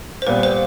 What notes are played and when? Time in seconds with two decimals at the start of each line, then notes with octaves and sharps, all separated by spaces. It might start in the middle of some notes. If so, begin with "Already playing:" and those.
0.22 C5
0.27 A#2 G3 B3 B4
0.43 C5